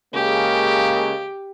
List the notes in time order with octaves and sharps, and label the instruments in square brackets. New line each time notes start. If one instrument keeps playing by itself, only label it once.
[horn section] C#3 G#3 A#3 [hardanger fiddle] G4